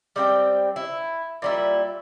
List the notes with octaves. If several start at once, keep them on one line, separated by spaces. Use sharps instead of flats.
G3 C4 G5
E4
A#2 G3 E4